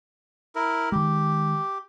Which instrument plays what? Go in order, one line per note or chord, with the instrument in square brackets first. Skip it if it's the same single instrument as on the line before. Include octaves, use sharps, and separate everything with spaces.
[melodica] E4 A#4
[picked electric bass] D#3 G#3 [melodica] G4